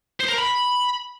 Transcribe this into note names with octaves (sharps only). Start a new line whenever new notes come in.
C5
A#4
B5